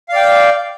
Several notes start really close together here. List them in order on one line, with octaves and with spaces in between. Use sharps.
F5 D5 G5